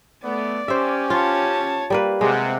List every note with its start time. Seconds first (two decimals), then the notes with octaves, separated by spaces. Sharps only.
0.24 A3 B3 D5
0.68 C#4 G4 C5 E5
1.10 F4 C#5 A5
1.90 G3 A#3 B4
2.21 C3 G#3 C4 F#5